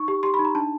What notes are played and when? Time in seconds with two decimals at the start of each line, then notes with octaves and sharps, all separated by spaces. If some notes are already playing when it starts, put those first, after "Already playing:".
Already playing: D#4 C#6
0.08 G4
0.23 G4 C6
0.34 B5
0.39 D#4
0.45 A#5
0.55 D4 A5